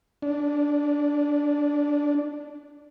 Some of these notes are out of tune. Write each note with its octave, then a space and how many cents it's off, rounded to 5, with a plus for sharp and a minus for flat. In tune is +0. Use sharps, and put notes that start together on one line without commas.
D4 -10